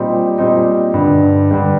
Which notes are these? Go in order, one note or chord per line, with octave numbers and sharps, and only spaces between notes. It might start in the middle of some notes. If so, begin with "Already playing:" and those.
Already playing: A#2 G3 C4 D#4
A#2 G3 C4 D#4
G2 D3 G3
G2 D3 G3